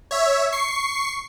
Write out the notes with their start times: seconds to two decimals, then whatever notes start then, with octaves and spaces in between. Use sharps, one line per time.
0.11 C#5 E5
0.52 C#6 C7